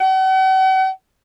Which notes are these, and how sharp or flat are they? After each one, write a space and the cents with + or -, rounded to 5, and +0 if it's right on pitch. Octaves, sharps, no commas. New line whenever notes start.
F#5 +45